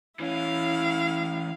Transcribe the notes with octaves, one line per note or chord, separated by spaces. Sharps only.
E3 C#4 E4 F5